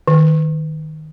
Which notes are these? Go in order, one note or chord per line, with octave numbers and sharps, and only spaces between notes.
D#3